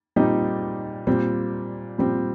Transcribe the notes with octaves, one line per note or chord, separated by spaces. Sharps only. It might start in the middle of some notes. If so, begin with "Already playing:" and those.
A#2 G3 C4 D#4
A#2 G3 C4
A#2 G3 C4